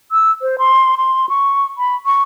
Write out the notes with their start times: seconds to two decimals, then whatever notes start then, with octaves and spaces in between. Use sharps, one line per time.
0.12 E6
0.42 C5
0.58 C6
0.97 C6
1.29 C#6
1.78 B5
2.06 C#6